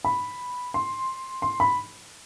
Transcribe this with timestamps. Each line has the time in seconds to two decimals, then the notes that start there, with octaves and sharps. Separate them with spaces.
0.05 B5
0.74 C6
1.42 C6
1.60 B5